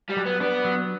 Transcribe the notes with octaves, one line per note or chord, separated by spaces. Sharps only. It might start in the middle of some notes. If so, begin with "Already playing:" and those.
G3
F#3
B3
B3 D4
F#3